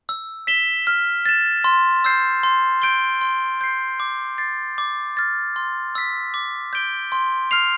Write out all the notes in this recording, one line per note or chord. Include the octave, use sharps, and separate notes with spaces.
E6
B6 E7 G7
F6
A6 E7
C6
E6 G6 C7
C6
G6 D7 G7
C6
G6 C7
D6
A6 C7
D6
F6 A6
C6
E6 B6
D6
G6 D7 G7
C6
F6 C7 F7